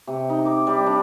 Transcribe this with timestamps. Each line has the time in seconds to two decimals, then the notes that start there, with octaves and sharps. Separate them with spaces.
0.07 C3
0.29 D#4
0.45 D6
0.67 G3
0.86 D4